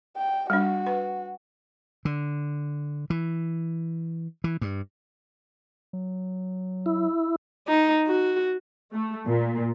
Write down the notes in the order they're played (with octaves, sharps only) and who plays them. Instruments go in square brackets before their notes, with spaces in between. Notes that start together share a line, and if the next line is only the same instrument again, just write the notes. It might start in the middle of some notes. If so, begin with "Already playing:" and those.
[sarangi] G5
[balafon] G3 D4 [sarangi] F#4
[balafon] B4
[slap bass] D3
E3
E3
G2
[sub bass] F#3
[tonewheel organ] E4
[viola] D#4
F#4
[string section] A3
A#2